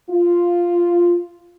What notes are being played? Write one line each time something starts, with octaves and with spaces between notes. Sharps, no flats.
F4